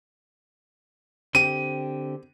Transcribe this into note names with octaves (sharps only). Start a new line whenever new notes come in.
D3 C4 G4 D#7